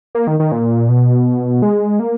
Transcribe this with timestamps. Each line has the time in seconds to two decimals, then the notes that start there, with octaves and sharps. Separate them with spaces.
0.15 A#3
0.27 D#3
0.40 D#3
0.52 A#2
0.89 B2
1.62 G#3
1.99 A#3